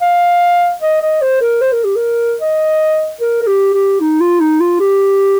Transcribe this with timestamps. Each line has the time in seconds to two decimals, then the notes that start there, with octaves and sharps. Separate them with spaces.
0.02 F5
0.82 D#5
1.02 D#5
1.22 C5
1.41 A#4
1.61 C5
1.73 A#4
1.85 G4
1.96 A#4
2.41 D#5
3.21 A#4
3.42 A#4
3.47 G4
3.73 G4
4.00 D#4
4.20 F4
4.40 D#4
4.60 F4
4.80 G4